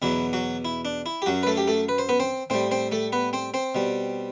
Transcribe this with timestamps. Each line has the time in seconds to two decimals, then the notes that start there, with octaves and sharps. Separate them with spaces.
0.02 E2 B2 F#3 E4
0.33 F#3 F#4
0.65 E4
0.85 D4
1.06 E4
1.22 G4
1.26 F#2 F#3 F#4
1.43 B4
1.47 A3 A4
1.57 G4
1.68 A3 A4
1.89 B4
1.98 C5
2.09 B3 B4
2.20 C4 C5
2.50 A2 G3 C4 C5
2.71 C4 C5
2.92 A3 A4
3.12 B3 B4
3.33 C4 C5
3.54 C4 C5
3.75 B2 G3